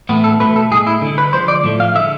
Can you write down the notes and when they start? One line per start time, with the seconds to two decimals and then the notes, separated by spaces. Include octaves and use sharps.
0.09 A2 E3 A3 B3
0.24 A4
0.40 B2 A3 B4
0.56 A4
0.71 A2 G#3 G#4
0.87 E4
1.02 D3 G#3
1.18 B4
1.33 D3 F3 G#3 C5
1.48 D5
1.64 A2 F3 A3
1.80 F5
1.95 D3 E5
1.99 G#3